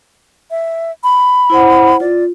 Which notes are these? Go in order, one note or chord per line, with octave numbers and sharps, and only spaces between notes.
E5
B5
E4 C5 F#5
F4 D5